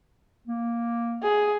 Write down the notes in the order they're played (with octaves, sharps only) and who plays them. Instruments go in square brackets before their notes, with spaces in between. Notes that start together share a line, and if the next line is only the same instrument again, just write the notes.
[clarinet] A#3
[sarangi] G#4